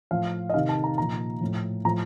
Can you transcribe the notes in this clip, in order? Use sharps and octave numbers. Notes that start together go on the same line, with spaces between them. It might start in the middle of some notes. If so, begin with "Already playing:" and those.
A2 F3 F5
D#5
C3 D#3 F5
A5
A#5
A#2 F3 A#5
A2 F3
A2 F3 A#5